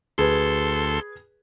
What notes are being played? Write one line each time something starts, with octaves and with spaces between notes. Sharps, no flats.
D2 G#4 A4 B4 C6